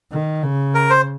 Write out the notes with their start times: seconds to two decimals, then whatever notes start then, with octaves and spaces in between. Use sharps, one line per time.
0.12 D#3
0.43 C#3
0.74 A#4
0.90 C5